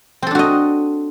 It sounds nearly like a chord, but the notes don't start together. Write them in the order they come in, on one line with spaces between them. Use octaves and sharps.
C4 A4 D4 F#4 D#5